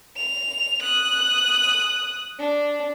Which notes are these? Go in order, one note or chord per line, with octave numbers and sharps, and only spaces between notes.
F7
D#6 F#6
D4